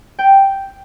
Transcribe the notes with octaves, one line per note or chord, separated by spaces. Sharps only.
G5